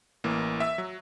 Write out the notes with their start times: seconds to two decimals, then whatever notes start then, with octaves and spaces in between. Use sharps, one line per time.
0.24 A1 E3 A#3
0.60 E5 E6
0.78 F#3